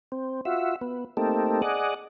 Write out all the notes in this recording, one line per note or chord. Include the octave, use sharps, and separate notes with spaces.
C4
F4 F#4 E5
B3
A3 A#3 C4 D#4 G4 A4
G#4 D5 D#5 F#5